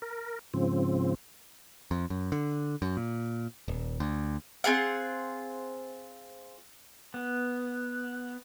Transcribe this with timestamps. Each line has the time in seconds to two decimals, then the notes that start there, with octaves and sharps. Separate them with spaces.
0.02 A#4
0.54 G#2 C#3 F3 C4
1.91 F2
2.10 F#2
2.32 D3
2.82 F#2
2.97 A#2
3.68 D#1
4.00 D2
4.64 C4 F4 G#4 F#5
7.14 B3